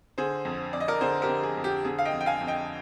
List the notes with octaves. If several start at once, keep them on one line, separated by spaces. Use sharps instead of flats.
D3 G#4 C5
F2
F2 D5
D#5
A#4 D5
D3 G#4 C5
G4 A#4
D3
G#4
F2
G4
D3 G#4
F5
D#5 G5
F2
G5
F5 G#5
F2
D#5 G5